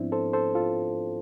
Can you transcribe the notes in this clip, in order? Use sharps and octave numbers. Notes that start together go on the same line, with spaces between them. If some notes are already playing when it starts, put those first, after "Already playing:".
Already playing: G#2 F3 B3 C4 D4 E4
A4 C5
A4 C5
F4 A4